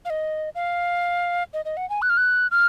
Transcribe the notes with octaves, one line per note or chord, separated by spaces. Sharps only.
F5
D#5
F5
D#5
D#5
F#5
G#5
F#6
F6
F#6
F6